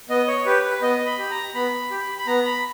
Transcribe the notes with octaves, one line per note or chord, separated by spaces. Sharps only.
B3 D#5
C#5
G4 B4
B4
B3 D#5
B5
G4
A#5
B3 B5
G4
B5
B3 A#5
B5